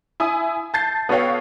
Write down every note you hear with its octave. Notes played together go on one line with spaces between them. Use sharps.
E4 G#5 D#6
A5 G6 A6 C7
B3 F#4 A4 C#5 F5 G5